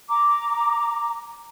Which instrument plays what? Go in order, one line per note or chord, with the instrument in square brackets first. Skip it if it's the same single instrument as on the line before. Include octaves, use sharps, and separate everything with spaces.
[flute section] A#5 D6